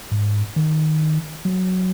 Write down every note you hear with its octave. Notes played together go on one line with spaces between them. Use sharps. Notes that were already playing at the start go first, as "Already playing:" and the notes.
G#2
D#3
F#3